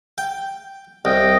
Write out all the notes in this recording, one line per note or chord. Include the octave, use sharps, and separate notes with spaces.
G5
C2 D#5 G5